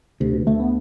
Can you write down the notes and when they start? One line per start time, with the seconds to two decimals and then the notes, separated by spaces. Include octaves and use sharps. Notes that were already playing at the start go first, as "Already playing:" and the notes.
0.20 D2 C3
0.33 B2
0.47 D2 A3
0.60 B3